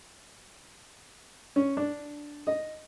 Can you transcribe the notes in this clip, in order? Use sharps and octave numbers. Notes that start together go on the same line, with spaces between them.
C#4
D4
D#5